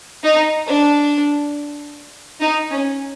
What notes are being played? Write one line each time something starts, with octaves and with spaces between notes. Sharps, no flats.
D#4
D4
D#4
C#4